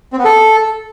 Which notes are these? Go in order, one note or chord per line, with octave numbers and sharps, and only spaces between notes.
C4
B3
A4